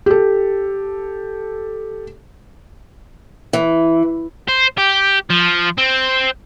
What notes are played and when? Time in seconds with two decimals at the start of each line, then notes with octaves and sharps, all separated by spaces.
0.06 G4 A4
3.53 E3
4.48 C5
4.78 G4
5.30 F3
5.78 C4